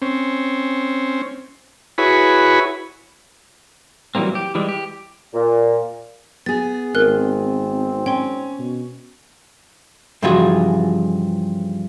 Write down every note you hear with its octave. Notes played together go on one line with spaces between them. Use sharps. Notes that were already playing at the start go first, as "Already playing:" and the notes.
C4 C#4
E4 F#4 G#4 B4 C#5 B5
E3 F#3 G3 A#3 C4
G4
E3 G3 G#3
G4
A#2
B3 G#4 A6
G#1 C4 A#4 F#6
C#4 G5 C6
B2
G2 C#3 E3 F3 F#4 G#4